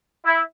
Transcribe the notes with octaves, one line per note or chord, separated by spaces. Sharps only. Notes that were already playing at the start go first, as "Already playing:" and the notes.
E4